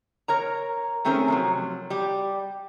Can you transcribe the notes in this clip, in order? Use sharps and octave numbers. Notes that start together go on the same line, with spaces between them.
A#4 C#5 A#5
D#3 A3 C4 C#4 G#4 A#4
C3 F3 F#3
G3 G4